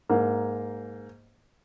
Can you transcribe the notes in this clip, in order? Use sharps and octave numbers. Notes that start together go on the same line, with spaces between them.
G#2 A#3